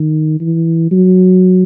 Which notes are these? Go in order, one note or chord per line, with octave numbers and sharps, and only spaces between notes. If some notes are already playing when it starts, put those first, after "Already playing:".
Already playing: D#3
E3
F#3